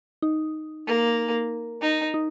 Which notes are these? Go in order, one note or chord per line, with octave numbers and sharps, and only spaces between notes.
D#4
A#3
D#4
D#4